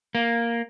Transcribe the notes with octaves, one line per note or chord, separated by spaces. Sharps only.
A#3